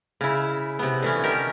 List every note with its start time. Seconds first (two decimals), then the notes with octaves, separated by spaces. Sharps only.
0.21 C#3 E4
0.79 C3 B3
1.02 D3 E3 C#4
1.24 D#3 G4 A#4